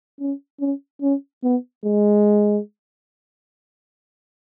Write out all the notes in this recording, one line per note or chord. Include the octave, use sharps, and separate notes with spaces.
C#4
C#4
C#4
B3
G#3